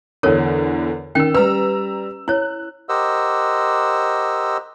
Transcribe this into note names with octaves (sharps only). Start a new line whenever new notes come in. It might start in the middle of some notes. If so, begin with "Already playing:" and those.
E2 D3 A4 A#4 C#5
D#3 C#4 G5 E6
G3 B4 A#5 E6
E4 C#5 F#6
G4 A#4 C5 D#5 F#5 E6